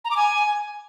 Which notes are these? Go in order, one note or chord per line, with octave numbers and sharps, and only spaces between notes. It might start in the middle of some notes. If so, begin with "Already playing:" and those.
A#5
D6
G#5